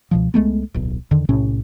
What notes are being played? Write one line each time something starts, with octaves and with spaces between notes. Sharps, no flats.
C#2 B2 F3
C2 G#3 A3 B3
D1 B1
E2 D3 D#3
B1 A2 C3 C#4